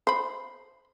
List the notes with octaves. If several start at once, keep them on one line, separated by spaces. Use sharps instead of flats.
C5 B5